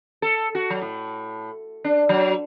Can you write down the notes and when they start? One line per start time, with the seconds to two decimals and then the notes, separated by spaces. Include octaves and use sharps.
0.22 A4
0.55 F#4
0.70 F#3
0.82 A2
1.84 D4
2.09 F#3